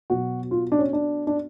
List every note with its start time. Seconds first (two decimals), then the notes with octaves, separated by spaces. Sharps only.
0.10 B2 F#3 F#4
0.51 F4
0.72 D4
0.79 C#4
0.93 D4
1.27 D4